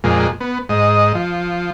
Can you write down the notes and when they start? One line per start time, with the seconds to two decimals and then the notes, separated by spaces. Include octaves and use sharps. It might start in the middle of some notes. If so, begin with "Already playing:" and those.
0.04 F2 A#2 G#3
0.40 B3
0.69 G#2 D#5
1.15 F3